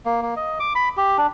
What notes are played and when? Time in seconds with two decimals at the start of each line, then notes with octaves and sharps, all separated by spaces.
0.06 A#3
0.22 A#3
0.36 D#5
0.60 D6
0.75 B5
0.97 G4
1.18 D4